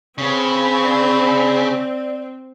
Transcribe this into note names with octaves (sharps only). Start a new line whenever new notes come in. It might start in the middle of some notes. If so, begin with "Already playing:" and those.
C#3 C4 B4 C#5
D5